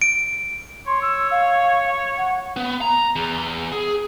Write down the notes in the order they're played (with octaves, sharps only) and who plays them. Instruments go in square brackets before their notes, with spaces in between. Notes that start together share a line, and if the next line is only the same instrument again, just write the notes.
[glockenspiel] D7
[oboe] C#5 [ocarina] C6
[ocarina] E6
F5
F#5
[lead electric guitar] B3
A#5
E2
G#4